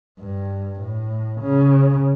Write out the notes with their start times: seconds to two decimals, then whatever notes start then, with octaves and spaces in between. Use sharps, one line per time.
0.20 G2
0.81 A2
1.41 C#3